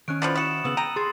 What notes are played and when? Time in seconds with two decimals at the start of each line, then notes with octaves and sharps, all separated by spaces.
0.08 D#3 C#4 F6 F#6 D7
0.22 D3 E3 F3 B5 A6 F#7
0.35 E4 F#4 D#6 C#7 E7
0.64 C#3 B3 D#6 E6 F#7
0.77 G5 A#5 D#7
0.96 G#4 C6 A6 C7